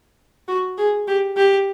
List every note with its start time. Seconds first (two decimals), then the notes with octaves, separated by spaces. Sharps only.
0.48 F#4
0.78 G#4
1.07 G4
1.37 G4